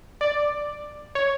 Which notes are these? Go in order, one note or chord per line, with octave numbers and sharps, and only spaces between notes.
D5
C#5